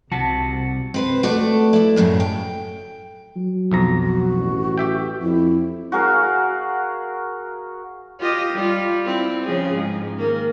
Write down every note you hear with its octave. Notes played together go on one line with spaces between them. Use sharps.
C2 C3 F#4 A5
C4 B4 C5
A3 F#4 A4 D5
E4 D5
F#2 A2 C#3 F#3
G5
F#3
B1 F2 A#5
F#4
A1
G4 E5 G5
F2 E4
F#4 G#4 A#4 F5
F4 G4 D#5
G3 F4
C4 E4
C#3 F3 G#4
G#2
D#3 A#3